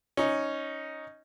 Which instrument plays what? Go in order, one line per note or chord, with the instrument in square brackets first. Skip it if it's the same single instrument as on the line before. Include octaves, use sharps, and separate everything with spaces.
[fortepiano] C#4 D#4